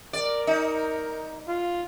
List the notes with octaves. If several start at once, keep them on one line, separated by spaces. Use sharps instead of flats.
A#4 D5
D#4
F4